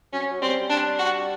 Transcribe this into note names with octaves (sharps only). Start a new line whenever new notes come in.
F#3 C#4
F#3
G3 C4
D4
F#4